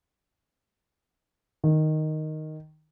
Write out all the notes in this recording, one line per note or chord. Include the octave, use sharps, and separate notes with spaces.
D#3